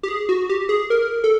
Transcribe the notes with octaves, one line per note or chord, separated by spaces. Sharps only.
G4
G#4
F#4
G4
G#4
A#4
A4